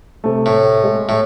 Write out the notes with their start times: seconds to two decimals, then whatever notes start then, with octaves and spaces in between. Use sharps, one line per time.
0.24 C3 A3
0.46 A2
0.83 G#3
1.09 A2